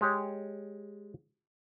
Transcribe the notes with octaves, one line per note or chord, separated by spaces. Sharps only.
G#3 G4 C#5